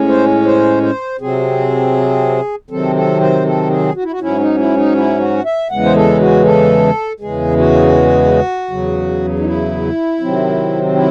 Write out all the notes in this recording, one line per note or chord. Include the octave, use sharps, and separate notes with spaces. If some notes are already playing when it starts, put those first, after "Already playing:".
Already playing: A2 G#3 C#4
C5
C5
C5
C3 F#3 C4 G#4
C3 D#3 F#3 C4 A4
A4
C5
A4
G#4
F#4
E4
F#4
G#2 F#3 C#4 E4
D#4
E4
D#4
E4
F#4
E5
E2 C#3 E3 G#3 F#5
C5
A4
F#4
A4
E2 C#3 E3 G#3 G#4
F#4
E2 C#3 F#3
D#4
E4
C3 D#3 F#3 C4
E4